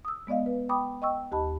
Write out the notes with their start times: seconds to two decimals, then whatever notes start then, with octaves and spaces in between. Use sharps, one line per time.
0.05 D#6 E6
0.27 G#3 B3 D5 D#5 F5
0.46 B4
0.69 G5 B5 D6 D#6
1.02 D#5 G5 C#6 E6
1.32 D#2 G4 D#5 A5 B5